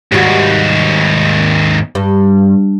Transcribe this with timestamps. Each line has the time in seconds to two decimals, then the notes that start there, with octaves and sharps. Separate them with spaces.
0.12 D#2 G#2 G3 F#4
1.95 G2